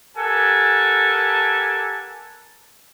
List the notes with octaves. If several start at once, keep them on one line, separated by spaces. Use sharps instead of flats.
G4 A4 A#4 F#5 G#5 A5